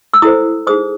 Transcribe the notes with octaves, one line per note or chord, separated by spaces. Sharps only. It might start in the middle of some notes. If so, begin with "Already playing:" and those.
E6
E4 A4 C5 D#6
D#4 G#4 C5 D#6